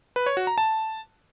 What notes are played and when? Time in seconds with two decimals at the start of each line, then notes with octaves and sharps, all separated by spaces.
0.16 B4
0.26 C#5
0.37 F#4
0.47 A#5
0.58 A5